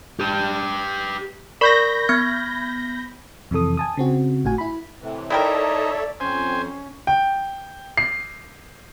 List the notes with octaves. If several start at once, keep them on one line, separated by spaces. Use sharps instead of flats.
G4 B4
A#4 D5 B5 C#6 G6 A#6
B3 F6 G#6
F2 C3 E3 A4 D#6
G#5 A5 D#6
C#3 C4 F#4
G#1 A2 F#4 G#5
E4 B5
A2 C3 E3
D#4 E4 G4 A4 A#4 C#5 D5 E5
F2 C#4 C5 G#5
G5
C7